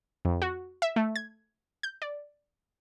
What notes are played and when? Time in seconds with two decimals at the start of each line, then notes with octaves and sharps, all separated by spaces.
0.25 F2
0.42 F#4
0.82 E5
0.96 A3
1.16 G#6
1.83 G6
2.02 D5